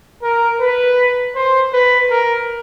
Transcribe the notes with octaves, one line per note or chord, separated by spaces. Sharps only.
A#4
B4
C5
B4
A#4